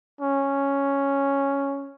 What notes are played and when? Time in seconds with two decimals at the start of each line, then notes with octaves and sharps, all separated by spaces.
0.21 C#4